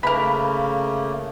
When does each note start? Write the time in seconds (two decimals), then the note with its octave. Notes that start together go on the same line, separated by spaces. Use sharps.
0.03 C#3 A3 A#3 A#4 B4